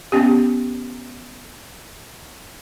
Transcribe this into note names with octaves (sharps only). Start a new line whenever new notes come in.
B3 C#4 G4